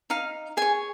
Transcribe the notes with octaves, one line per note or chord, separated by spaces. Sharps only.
D#4 F5
G#4 C#5 G#5